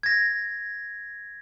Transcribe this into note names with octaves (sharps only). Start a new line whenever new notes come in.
G#6 A#6